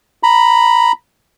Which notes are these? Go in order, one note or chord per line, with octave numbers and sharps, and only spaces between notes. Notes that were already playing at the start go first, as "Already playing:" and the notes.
A#5 B5